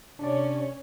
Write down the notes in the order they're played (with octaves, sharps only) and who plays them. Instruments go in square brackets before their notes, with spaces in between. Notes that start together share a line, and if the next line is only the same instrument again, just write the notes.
[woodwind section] C3 [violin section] C#4 [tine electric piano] D4 D5